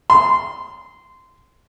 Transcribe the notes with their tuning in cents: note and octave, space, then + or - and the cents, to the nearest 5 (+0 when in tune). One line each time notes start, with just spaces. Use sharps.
C6 -15